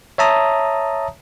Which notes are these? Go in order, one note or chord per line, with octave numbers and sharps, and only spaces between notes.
C#5 E5 A5 A#5 D#6